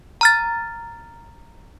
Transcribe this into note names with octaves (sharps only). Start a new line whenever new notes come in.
A#5 F6 A6